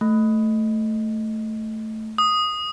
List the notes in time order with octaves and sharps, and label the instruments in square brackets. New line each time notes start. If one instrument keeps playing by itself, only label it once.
[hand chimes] A3
[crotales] D#6